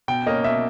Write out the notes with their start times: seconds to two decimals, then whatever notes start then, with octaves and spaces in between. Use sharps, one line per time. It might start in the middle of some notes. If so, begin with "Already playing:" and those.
0.08 B2 G5
0.26 A#3 C#4 D#5
0.44 B2 E5